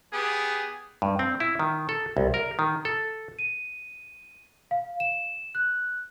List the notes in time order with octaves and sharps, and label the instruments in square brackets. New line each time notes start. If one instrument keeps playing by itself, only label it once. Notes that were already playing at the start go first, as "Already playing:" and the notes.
[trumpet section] B3 G4 G#4
[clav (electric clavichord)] G2
C4
E4
D#3
A4
C2
A#4
D#3
A4
[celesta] D#7
F5
E7
F#6